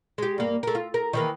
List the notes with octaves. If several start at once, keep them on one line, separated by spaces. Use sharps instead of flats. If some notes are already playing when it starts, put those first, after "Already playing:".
G#3 G4
G2 A#3
A3 A#4
F4
A#4
D#3 E3 A#3